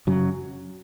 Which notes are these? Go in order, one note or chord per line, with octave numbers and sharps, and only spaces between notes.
F#2 C#3 F#3